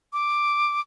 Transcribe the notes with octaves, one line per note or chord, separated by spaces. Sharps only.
D6